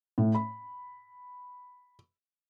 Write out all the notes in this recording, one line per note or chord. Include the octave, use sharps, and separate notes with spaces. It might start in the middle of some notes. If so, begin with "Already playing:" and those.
A2
B5